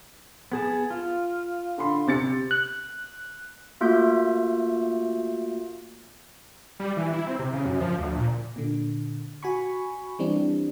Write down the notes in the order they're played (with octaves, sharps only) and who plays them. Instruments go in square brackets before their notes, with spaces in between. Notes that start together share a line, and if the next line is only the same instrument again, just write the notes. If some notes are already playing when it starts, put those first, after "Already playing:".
[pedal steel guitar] B3 G#4 A5
F4
[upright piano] D3 B5 C6
C3 A6 C#7
[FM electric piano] F#6
[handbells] A3 A#3 F4 F#4 E5 G6
[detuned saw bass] G3
E3
E4
C4
C3
C#3
F#2
F3
D2
A#2
[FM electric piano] A#2 D3
F#4 G#5 B5 C#6
E3 G3 C4 D4